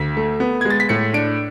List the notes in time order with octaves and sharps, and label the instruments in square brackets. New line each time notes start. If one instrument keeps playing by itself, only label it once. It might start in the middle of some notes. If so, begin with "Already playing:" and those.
Already playing: [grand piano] D2 B6
A3
B3
G#3 G#6
A6
B6
A2 C#7
D4 D7